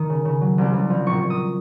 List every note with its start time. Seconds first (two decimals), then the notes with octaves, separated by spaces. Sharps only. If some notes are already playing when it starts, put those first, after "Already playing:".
Already playing: D#3 D#6
0.09 C#3
0.25 C#3
0.41 F#3
0.58 C2
0.73 C2
0.90 F3
1.06 A#1 C#6
1.22 A#1
1.30 D#6